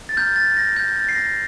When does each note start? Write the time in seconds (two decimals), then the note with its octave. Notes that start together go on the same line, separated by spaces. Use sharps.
0.09 A6
0.17 A#5 F6 G6
0.36 A6
0.57 A#6
0.76 G6
0.96 A6
1.09 C7
1.15 A#6